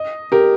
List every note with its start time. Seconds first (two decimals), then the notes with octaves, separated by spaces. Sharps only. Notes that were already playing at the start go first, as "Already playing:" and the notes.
Already playing: D#5
0.32 G4 A#4